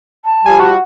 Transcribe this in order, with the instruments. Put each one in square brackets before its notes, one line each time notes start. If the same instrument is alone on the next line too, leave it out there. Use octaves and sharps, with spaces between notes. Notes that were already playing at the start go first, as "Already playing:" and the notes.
[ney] A5
[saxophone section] F3 G3 [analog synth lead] G#5
[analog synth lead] F#4